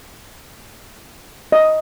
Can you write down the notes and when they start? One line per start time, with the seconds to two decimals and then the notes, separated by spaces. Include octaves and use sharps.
1.52 D#5